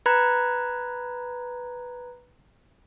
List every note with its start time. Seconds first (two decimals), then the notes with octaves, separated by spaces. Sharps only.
0.06 B4 A#5 B5 F#6 G#6